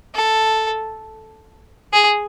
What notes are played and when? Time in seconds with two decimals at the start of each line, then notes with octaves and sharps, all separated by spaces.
0.15 A4
1.93 G#4